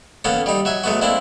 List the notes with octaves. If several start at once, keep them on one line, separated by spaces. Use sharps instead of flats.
A#3 B3 C#4 A4
G3 D#4
F#3 E5 G#5
F#3 G#3 A3 B3 F#4
A#3 C4 D4 E4